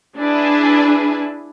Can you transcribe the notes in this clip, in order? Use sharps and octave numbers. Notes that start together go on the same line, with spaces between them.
D4 E4 G#4 B4